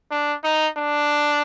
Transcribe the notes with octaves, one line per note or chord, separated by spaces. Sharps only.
D4
D#4
D4